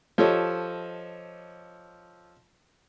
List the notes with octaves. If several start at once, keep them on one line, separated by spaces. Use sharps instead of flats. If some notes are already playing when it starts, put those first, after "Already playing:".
F3 G4 A4 C#5 D#5